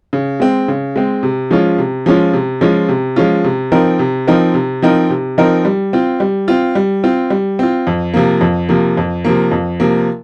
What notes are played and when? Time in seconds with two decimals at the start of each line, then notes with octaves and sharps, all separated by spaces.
0.13 C#3
0.40 G#3 C4
0.68 C#3
0.96 G#3 C4
1.23 C3
1.51 F3 G#3 C#4 F4
1.78 C3
2.06 F3 G#3 C#4 F4
2.33 C3
2.61 F3 G#3 C#4 F4
2.89 C3
3.16 F3 G#3 C#4 F4
3.44 C3
3.72 F3 C4 D#4 A#4
3.99 C3
4.27 F3 C4 D#4 A#4
4.54 C3
4.82 F3 C4 D#4 A#4
5.10 C3
5.38 F3 C4 D#4 A#4
5.65 G3
5.93 C4 F4
6.20 G3
6.48 C4 F4
6.75 G3
7.03 C4 F4
7.30 G3
7.59 C4 F4
7.87 F2
8.14 C3 F3 A#3
8.41 F2
8.69 C3 F3 A#3
8.97 F2
9.25 C3 F3 A#3
9.52 F2
9.80 C3 F3 A#3